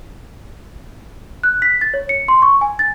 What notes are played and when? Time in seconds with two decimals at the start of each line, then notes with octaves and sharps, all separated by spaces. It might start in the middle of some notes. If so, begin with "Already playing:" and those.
1.43 F#6
1.62 B6
1.81 A6
1.94 C#5
2.09 C#7
2.28 C6
2.42 C#6
2.61 G#5
2.79 A6